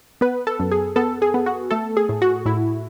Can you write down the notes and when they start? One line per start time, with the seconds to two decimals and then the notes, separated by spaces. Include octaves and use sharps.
0.21 B3 B4
0.47 A4
0.59 F#2
0.72 G#4
0.96 B3 A4
1.22 G#4
1.34 B3
1.46 F#4
1.71 A3 A4
1.97 G#4
2.09 A2
2.22 F#4
2.45 A2 E4